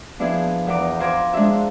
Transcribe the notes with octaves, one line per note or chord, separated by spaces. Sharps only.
F3 B3 D4 E4 G#4
E2 A#4 D6
F4 C5 G#5 A#5 D6
G#3 D4 F4 G#4 E5